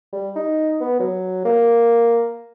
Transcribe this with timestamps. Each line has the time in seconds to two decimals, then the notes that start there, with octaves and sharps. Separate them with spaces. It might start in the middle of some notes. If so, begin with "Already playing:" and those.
0.12 G3
0.35 D#4
0.81 B3
1.00 F#3
1.45 A#3